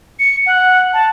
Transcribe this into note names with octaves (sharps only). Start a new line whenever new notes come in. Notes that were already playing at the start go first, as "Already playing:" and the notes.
C#7
F#5
A5